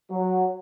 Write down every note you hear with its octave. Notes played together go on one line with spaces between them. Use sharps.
F#3